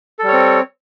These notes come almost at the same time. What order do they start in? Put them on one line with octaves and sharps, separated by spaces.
A4 G3 C#5 C4